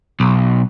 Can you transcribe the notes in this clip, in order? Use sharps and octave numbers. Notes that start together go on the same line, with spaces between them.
B1